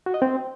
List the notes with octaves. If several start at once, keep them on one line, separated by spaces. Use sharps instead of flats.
F#4
D#5
C4